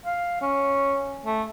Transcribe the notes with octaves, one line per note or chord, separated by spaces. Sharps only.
F5
C#4
A3